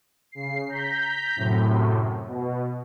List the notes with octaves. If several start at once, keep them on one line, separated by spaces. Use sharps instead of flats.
C#3 C7
A#5 G6 B6
F#2 A2 C3
B2